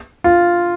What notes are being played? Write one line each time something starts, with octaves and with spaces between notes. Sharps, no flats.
F4